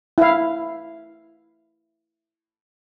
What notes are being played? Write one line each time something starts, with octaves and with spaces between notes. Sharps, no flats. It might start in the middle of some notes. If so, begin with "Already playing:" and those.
E4 F5